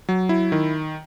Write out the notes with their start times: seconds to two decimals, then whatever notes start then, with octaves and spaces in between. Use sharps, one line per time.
0.09 F#3
0.29 E4
0.52 D#3